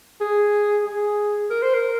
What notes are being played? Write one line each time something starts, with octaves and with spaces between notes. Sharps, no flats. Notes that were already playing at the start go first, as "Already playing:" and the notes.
G#4
G#4
A#4
C5
A#4